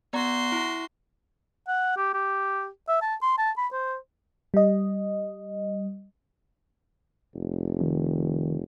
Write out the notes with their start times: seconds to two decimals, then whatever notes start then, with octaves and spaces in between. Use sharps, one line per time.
0.13 B3 F#4 D5 A#5 C6
0.52 E4
1.68 F#5
1.96 G4
2.14 G4
2.88 E5
3.01 A5
3.22 C6
3.38 A5
3.57 B5
3.72 C5
4.54 G3 D#5
7.35 F1
7.80 D#3